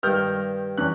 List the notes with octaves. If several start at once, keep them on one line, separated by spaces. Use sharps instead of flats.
G2 D#3 D#4 F6 G6
E2 C#4 F#6